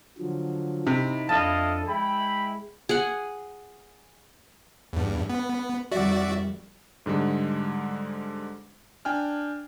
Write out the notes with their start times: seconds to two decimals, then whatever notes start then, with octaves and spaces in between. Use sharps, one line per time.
0.18 D3 F3 F#3
0.87 C3 D#4 E4
1.29 F2 D4 E4 A4 D#5 F5 A5
1.88 G#3 E4 G5 B5
2.89 G#4 F#5
4.93 E2 G2
5.29 B3
5.92 F2 D#3 G3 F#4 D5 E5
7.06 G#2 D3 G3 G#3
9.05 D4 G5 G#5 F6